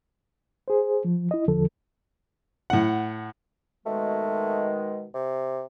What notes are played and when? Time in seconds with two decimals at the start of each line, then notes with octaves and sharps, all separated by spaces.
0.68 G#4 C5
1.05 F3
1.31 E4 D#5
1.48 E2 D3 F3 A4
2.70 A2 F#5
3.86 B2 D#3 G#3 A3
5.14 C3